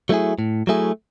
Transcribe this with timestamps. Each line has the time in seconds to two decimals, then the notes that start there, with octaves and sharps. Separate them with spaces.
0.09 F#3 A3 E4 G#4
0.39 A2
0.67 F#3 A3 E4 G#4